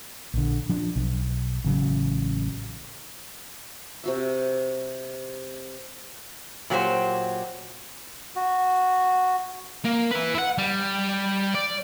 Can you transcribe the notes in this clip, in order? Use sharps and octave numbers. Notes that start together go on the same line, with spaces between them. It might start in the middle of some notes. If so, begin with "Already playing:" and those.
A#1 D3
F3 D4
B1
A1 C#3 F#3
C3 F#4 E5
A#2 F#3 G4 C5
F#4
A#3
E4 B4
E4 F#5
G3
D5